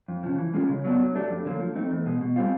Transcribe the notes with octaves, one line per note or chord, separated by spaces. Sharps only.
F2
C#3 F3
E3
G#3 C#4 F4 G#4
C#3
F#3 B3 D4
F#3
A3 D4 G4
F2
D3 F#3 A#3
F3
A3 C4 D#4
E2
B2 G#3
B2
G3 C4 F4